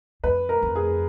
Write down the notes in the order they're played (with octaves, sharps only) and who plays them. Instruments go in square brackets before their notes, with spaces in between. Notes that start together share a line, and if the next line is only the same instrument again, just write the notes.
[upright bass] F2 [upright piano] B4
[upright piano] A#4
[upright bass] F2
[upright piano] G#4